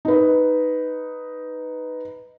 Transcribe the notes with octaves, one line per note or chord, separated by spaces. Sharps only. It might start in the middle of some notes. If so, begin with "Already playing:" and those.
D#4 B4